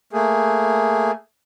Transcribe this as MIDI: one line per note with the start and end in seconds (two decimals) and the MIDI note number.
0.13 1.11 57
0.13 1.11 58
0.13 1.11 68